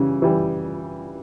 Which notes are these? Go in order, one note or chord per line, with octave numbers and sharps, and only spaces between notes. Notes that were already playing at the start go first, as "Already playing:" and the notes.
Already playing: C#3 E3 G3
E3 G3